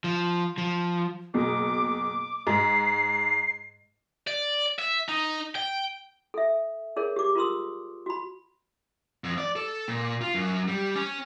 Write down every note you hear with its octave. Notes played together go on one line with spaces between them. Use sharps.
F3
F3
F#1 B2 D6
G#2 C7
D5
E5
D#4
G5
A4 E5
G#4 A#4 C#5
G4 D6
F4 A#4 B4 C6 D#6 E6
F#4 B5
F2
D5
A4
A#2
F4
F#2
G3
C#4